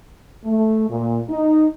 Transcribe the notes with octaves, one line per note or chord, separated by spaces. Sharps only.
A3
A#2
D#4